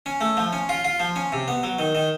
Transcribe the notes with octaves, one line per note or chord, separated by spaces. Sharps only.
C#4
A3
F3
C#4
F4
F4
F3
C#4
C3
B3
F#3
D#3
D#3